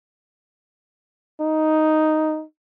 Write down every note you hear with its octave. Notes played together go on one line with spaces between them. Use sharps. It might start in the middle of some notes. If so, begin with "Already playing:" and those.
D#4